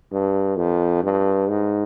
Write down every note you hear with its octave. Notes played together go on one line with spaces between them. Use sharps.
G2
F2
G2
G#2